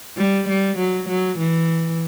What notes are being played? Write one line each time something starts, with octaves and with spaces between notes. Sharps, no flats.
G3
G3
F#3
F#3
E3